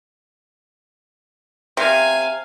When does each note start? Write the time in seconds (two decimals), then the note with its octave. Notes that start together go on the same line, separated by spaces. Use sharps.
1.77 C3 F5 G#5